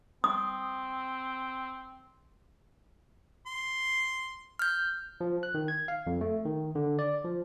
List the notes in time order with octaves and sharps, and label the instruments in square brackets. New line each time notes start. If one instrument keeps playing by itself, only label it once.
[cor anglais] C4 [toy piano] D#6
[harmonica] C6
[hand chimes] F6 G6
[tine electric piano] F3
F#6
D#3
G#6
F5
F2
A3
D#3
D3
D5
F3